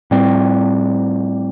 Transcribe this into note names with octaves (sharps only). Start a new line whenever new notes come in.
A2 G3 C4